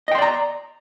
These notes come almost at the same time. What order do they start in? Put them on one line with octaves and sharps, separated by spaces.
D#5 G5 C6 D5 A#5